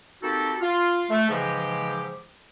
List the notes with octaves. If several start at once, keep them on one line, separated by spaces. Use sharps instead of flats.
A#3 C4 D#4 F#4 G4 A4
F4
A3
G#2 C#3 E3 F3 G#3 G4